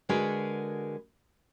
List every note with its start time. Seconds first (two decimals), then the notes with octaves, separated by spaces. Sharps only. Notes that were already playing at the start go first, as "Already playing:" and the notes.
0.09 D3 G#3 F#4 G#4 A#4 B4